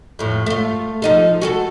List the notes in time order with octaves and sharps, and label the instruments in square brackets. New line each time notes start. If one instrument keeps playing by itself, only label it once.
[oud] F2 A2
A3 F4
F3 D#4 A4
F#4 G#4 A4